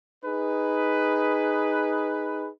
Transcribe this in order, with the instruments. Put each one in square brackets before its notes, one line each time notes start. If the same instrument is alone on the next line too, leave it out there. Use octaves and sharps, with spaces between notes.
[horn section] D#4 G#4 B4